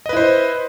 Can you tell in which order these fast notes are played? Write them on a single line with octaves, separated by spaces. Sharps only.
D#5 B4 E4 C5